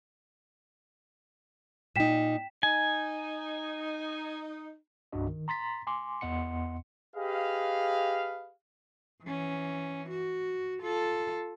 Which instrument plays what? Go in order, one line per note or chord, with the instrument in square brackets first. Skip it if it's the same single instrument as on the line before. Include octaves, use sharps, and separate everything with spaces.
[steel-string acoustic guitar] A#2 D#4 [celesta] G5 B6 E7
[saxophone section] D#4 [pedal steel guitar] G#5
[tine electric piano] C2 G2 D4 F#4 D#5
D#3
A#5 C6 A6 B6
G#5 C6 D6
E2 B3 D#5 F#5 C6 C#7
[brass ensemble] G4 G#4 B4 D#5 F5
[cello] E3 C#4
F#4
F4 A4